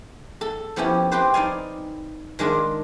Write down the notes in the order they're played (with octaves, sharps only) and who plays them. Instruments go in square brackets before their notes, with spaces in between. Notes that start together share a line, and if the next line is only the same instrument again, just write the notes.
[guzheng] A4
F3 B3 C#4 E4 G4
C4 G4 B4 C5
D#4 D5 F5 G#5
D#3 G#3 D4 F4